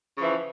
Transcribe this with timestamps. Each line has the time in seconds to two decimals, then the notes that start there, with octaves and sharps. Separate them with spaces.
0.17 C#3
0.19 F3
0.22 E3